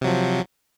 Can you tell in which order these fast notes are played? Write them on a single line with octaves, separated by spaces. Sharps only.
C3 F#3 F3